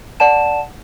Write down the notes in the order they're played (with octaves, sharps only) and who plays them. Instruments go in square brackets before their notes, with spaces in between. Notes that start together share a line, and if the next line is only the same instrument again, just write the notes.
[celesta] D5 F#5 A5 E7